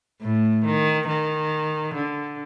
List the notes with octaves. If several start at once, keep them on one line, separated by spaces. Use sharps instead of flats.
A2
D#3
D#3
D3